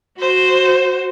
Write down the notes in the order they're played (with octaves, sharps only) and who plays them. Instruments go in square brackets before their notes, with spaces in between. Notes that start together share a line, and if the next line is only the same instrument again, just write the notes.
[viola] F#4 C5